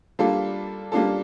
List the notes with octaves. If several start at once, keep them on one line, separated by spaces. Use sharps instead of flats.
G3 A#3 D4 F4 A4
G3 A#3 D4 F4 A4